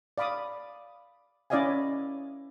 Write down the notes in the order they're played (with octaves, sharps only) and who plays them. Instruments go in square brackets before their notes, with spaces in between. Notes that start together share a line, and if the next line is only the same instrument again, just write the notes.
[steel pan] D5 F5 B5 D6 D#6
C#4 E4 D5 D#5 F5 G#5